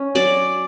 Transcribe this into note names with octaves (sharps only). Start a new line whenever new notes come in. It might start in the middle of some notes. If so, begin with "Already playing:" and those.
Already playing: C#4
F#3 D5